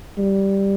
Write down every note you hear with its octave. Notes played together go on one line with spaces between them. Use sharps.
G3